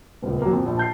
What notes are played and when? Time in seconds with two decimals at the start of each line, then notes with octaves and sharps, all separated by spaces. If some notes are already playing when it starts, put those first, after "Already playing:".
0.23 D#1 C#2
0.42 F#3 A#3
0.53 F2
0.66 A#1
0.77 A5 G6 C7